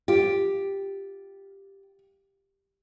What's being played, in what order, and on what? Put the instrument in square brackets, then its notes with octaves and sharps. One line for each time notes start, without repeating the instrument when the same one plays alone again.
[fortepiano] F4 [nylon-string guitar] G4